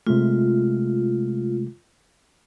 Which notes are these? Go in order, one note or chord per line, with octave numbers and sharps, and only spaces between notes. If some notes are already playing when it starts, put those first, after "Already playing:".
C3 G#3 A3 F4